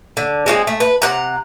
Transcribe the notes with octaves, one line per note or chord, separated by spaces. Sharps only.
D3
G#3 C4 F#4 G#4
A3
B4
C3 F#5 A#5